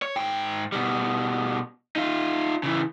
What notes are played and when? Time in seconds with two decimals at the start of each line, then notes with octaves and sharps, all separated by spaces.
0.02 C#5
0.16 G#2 G5
0.72 B2 G3
1.96 D#4 F4
2.63 C#3 E3